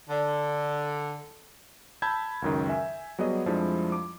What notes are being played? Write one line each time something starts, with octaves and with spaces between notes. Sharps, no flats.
D3
A5 B5 E6 G6 G#6
C#2 F#2 D#3
E5 G#5
F#3 G3 B3 G#4 D#5
F2 F3 G3 G#3 D4 E4
D6